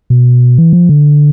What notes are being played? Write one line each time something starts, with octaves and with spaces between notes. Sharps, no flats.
B2
E3
F3
D3